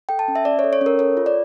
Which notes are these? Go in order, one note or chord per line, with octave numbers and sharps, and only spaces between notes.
A4 G5
A5
C#4
E5
C#4 D5
C#5
A4
C#5
C#4
A#4
A4 C#5
F4
D5